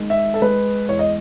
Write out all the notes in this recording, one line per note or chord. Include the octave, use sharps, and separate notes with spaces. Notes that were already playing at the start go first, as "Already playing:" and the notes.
Already playing: D#3 G#3
E5
A4
G#3 B4
E2 C#5
D#5